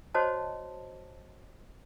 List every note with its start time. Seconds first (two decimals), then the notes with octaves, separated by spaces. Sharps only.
0.14 F#4 C5 C#5 D#5 A5